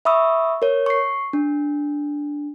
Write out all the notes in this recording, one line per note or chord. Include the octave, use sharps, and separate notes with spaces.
E5 B5 C#6 D#6 E6
A#4 C#5
C#6 C7
D4